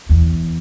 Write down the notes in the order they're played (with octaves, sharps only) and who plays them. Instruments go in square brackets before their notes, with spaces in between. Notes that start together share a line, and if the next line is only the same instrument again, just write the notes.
[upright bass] E2